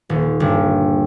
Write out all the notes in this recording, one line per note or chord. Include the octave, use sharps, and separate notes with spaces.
D#1
G1